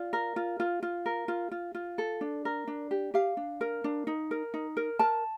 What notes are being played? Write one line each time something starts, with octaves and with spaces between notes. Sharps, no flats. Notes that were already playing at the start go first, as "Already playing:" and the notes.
Already playing: F4 D5
A#4
F4
F4
F4
A#4
F4
F4
F4
A4
D4
A#4
D4
G4
G4 F5
D4
A#4
D4
D#4
A#4
D#4
A#4
A#4 A5